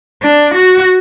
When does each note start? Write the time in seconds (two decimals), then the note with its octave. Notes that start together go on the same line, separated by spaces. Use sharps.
0.22 D4
0.54 F#4